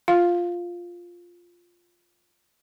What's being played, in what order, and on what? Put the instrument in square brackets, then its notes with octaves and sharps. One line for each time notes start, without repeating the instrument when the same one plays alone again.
[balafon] F4 F5